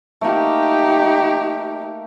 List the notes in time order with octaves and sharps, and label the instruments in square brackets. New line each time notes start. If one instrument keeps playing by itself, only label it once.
[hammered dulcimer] A3 A#3 [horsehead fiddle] D#4 G4